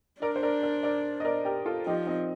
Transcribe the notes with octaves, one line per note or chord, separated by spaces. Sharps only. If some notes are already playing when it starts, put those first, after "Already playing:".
D4 A#4 D5
C5
A#4 D5
A#4 D5
A#4 D5
D#5
A#4 D5
G4 A#4
F4 A4
F3 D#4 G4
C4 D#4